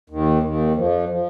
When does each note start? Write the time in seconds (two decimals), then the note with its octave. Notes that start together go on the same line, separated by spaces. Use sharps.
0.10 D#2 D#3
0.43 D#2 D#3
0.75 F2 F3
1.09 F3